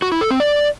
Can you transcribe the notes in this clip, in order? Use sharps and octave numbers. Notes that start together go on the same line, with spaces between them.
F#4
E4
A4
C4
D5